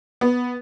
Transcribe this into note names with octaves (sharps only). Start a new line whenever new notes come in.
B3